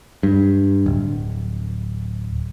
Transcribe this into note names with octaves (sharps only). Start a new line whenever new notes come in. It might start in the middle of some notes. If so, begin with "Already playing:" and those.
G2
D1